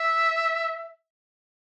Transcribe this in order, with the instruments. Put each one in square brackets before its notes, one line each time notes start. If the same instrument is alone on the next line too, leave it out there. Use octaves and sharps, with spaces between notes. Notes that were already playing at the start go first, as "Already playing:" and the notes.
Already playing: [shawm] E5